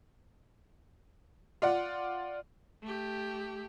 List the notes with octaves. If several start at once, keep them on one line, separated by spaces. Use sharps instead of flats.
F4 D5 F#5
A3 G4